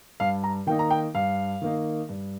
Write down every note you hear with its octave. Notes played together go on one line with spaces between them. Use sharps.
G2 F5
A#5
D#3 A#3 D#4 G5
A#5
G5
G2 F5
D#3 A#3 D#4
G2